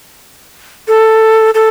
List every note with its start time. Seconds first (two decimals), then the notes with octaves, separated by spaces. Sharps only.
0.88 A4
1.54 A4